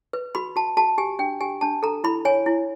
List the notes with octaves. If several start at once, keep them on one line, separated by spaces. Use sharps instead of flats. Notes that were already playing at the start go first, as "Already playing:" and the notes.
B4
F#4 B5
F#4 A5
F#4 A5
G4 G#5
D4 G5
G4 G#5
D4 A5
A4 A#5
E4 B5
C#5 G#5
E4